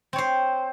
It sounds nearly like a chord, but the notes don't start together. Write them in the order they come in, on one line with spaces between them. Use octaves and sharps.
C4 C#5 C5